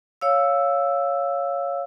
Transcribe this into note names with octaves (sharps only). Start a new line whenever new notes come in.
C#5 F5 E6